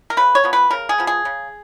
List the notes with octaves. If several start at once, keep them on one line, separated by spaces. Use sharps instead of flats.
A#4
C#3 B4
C#5
F3 B3
B4
C#3 A#4
G#4
F3 B3
G#4
C#3